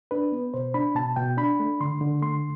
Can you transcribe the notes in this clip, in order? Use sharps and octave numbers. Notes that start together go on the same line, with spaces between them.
D4 B4
B3
B2 C5
D4 B5
B2 A5
B2 G5
D4 B5
A3
D3 C6
D3
A3 C6